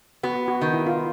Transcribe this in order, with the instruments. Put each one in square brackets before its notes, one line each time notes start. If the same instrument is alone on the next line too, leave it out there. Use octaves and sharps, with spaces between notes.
[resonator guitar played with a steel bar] B3 [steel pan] F#4
[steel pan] F#4
[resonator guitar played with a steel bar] D#3
[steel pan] E4
F4